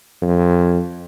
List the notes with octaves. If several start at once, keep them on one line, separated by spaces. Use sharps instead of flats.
F2